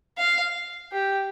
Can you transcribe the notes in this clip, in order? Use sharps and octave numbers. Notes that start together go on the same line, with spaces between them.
F5
G4